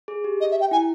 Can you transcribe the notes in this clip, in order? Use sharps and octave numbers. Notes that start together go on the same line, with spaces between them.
G#4
G4
D#5
E5
G5
E4 G#5